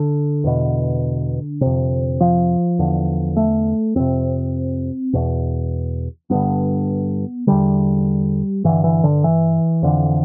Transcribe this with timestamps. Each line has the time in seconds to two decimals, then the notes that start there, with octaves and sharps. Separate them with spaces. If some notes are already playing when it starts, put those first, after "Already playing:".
Already playing: D3
0.44 E2 B2
1.61 F2 C3
2.20 F3
2.79 E2 D3
3.37 A3
3.96 F2 C3 C4
5.13 E2 B2
6.30 G2 D3 B3
7.47 E2 D3 G3
8.64 G2 D3 E3
8.84 E3
9.04 D3
9.24 E3
9.83 F2 D3